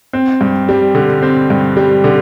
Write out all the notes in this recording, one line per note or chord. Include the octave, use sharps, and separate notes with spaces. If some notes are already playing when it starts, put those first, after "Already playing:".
C4
G2
G3
D3
C4
G2
G3
D3